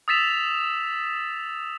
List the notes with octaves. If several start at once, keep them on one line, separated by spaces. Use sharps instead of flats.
D#6 E6 A6 B6 E7 F7